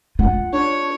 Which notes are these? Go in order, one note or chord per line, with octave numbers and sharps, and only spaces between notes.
F4 F#5
D4 C#5